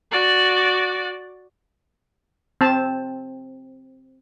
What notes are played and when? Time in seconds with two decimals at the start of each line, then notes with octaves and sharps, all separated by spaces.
0.12 F#4 D5
2.61 C4 A5